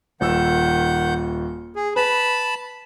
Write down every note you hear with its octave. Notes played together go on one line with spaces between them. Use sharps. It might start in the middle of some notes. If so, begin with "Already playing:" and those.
D#1 D#3 F#5 E6 G6
G#4
B4 A5 B5